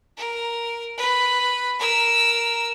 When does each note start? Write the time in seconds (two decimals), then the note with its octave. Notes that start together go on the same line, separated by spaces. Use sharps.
0.17 A#4
0.98 B4
1.79 A#4 E6